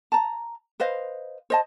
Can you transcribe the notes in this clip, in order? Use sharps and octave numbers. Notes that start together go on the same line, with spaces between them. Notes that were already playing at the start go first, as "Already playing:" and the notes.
A5 A#5
B4 C5 D#5 F5
C5 D#5 A5